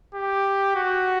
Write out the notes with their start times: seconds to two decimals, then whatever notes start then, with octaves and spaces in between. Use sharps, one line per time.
0.15 G4
0.76 F#4